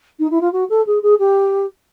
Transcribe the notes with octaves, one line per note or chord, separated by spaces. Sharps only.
D#4
E4
F4
F#4
A4
G#4
G#4
G4